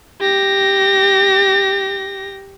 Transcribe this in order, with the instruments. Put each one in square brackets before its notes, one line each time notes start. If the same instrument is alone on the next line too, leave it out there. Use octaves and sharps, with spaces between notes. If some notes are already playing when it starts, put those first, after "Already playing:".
[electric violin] G4 A#6